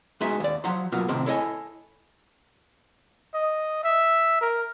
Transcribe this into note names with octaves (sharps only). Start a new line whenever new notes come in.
G#3 B3 D#4 F#4 E5 G#5
D#2 D5
F3 F#3 F#5 A#5 C6
B2 F#3 A#3 B3 F4 F#4
A2 C3 D#3 C4
E4 A4 C#5 D#5 G#5
D#5
E5
A#4